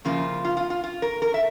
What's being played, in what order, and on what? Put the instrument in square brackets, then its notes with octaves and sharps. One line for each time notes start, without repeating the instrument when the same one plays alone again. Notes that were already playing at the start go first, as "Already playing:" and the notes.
[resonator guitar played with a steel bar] F2 C#3 F3 A#3 E4 F4
F4
F4
F4
F4
A#4
A#4
E5